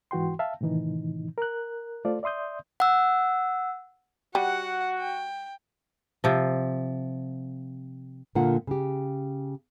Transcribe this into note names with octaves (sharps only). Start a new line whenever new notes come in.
G#2 E3 F#4 G5 C6
E5 F5 A5
A2 C3 D#3 E3 D#4
A#4 F#6
A3 F4 A4 C5 D5
D5 E5 C6 D#6 G6
F#5 E6
G3 F#4 F#5
G5
C3 F3
A#2 D3 A#3 F4 F#5
C#3 G4